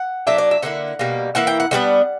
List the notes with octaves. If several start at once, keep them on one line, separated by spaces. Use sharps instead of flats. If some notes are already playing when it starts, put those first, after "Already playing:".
Already playing: F#5
F#3 A#3 D4 E5
D5
E5
D3 A#3 E4 F#5
B2 G3 A#3
E3 A#3 E4 F#5
G5
F#5
D3 G3 B3 D4 F#5